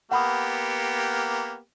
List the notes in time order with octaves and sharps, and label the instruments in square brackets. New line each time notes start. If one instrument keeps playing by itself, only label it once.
[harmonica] A#3 B3 G4 [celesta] F#5 B5 D#6